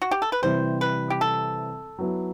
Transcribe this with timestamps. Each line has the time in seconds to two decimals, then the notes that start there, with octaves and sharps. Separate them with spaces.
0.02 F#4
0.11 G4
0.22 A4
0.32 B4
0.42 C3 E3 G3 C5
0.81 B4
1.10 G4
1.21 A4
1.99 F#3 B3 E4